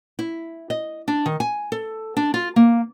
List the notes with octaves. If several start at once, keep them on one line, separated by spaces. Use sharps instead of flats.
E4
D#5
D4
D#3
G#5
A4
D4
F4
A#3